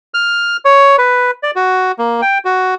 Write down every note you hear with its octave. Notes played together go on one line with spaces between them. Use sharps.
F6
C#5
B4
D5
F#4
A#3
G5
F#4